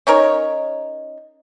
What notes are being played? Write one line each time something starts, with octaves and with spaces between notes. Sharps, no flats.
C#4 D#4 A#4 C#5